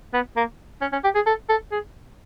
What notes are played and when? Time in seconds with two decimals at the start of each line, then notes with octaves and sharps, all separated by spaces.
0.14 B3
0.37 A#3
0.81 C#4
0.93 C#4
1.04 G4
1.15 G#4
1.26 A4
1.49 A4
1.72 G#4